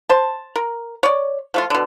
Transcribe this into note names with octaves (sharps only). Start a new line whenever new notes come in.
C5 A5
A#4
C#5 D5
F3 A3 F4
B2 D3